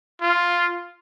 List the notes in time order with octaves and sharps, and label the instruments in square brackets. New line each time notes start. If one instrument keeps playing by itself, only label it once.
[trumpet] F4